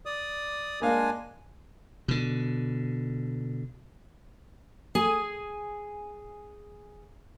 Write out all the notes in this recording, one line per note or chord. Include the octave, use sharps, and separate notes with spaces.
D5 D#6
G#3 A#3 D4 F5 G#5
B2 D3
G#4 G#5